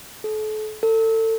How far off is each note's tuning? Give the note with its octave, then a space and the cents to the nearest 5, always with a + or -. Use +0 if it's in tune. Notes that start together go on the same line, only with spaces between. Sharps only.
A4 -35
A4 +30